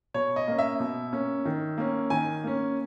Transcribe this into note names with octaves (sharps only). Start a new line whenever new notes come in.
B2 C#5
D#5
A#3 C#4
E5
B2
A#3 C#4
D#3
A#3 C#4
D#3 G#5
A#3 C#4